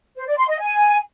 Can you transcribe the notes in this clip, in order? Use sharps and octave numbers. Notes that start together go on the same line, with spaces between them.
C5
D5
C6
D#5
G#5